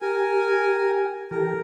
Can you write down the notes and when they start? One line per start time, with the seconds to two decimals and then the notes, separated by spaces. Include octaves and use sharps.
0.01 G4 A#4 G#5
1.31 E3 G4 A4 A#4